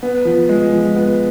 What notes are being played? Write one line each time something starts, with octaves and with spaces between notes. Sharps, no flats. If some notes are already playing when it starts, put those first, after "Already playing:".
B3
F3
G#3
F3
B3